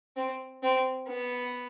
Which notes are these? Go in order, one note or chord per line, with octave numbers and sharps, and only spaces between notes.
C4
C4
B3